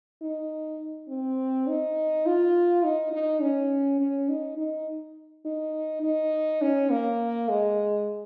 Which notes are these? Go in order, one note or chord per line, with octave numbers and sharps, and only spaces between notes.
D#4
C4
D#4
F4
D#4
D#4
C#4
C#4
D#4
D#4
D#4
D#4
C#4
A#3
G#3